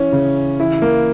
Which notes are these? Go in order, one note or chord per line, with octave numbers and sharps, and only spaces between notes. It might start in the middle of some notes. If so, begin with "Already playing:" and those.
Already playing: E3 C#4
C#3
E3 E4
A#3